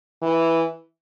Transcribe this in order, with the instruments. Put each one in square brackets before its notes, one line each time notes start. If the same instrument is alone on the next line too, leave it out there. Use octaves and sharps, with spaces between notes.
[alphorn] E3